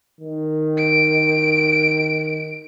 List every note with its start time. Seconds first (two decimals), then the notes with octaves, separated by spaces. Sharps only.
0.21 D#3
0.77 D7